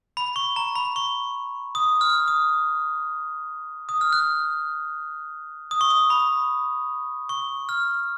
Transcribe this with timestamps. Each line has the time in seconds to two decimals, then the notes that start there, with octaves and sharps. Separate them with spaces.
0.17 B5
0.36 C#6
0.56 A#5
0.75 B5
0.96 C#6
1.75 D#6
2.01 F6
2.28 D#6
3.89 D#6
4.01 F6
4.13 F#6
5.71 D#6
5.81 C#6
5.90 D#6
6.10 B5
7.29 C#6
7.69 F6